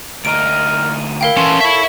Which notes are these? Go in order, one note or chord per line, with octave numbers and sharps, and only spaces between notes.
D2 D#4 A#4 D7
E4 A#4 F5 G5
E3 C#4 A4 C6
C#5 E5 B5